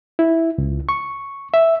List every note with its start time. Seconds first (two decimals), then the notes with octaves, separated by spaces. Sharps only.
0.19 E4
0.58 C#2
0.89 C#6
1.54 E5